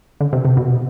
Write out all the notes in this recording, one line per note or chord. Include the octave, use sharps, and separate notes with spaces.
D3
C3
C3
B2